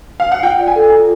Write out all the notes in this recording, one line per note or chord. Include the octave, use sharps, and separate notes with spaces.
F5
F#5
F4 G5
D5
G#5
A4
F4